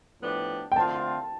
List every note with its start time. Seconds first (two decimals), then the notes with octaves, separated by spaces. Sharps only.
0.21 A2 F3 B3 D4 G4
0.72 G5
0.76 D3 A3 C4 F4 A5